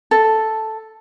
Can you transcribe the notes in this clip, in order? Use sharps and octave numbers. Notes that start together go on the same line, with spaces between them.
A4